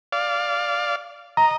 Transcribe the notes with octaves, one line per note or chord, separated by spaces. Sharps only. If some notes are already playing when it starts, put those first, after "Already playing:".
D5 F5
D#5 A#5